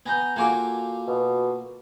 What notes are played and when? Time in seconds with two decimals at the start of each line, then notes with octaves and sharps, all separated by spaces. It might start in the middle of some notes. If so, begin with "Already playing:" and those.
0.06 B3 G#5 A#5 G6
0.36 A#3 F4 F#4 A4 G#5 D6
1.07 B2